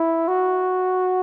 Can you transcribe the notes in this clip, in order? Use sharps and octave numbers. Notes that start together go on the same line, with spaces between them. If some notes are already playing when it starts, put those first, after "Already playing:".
Already playing: E4
F#4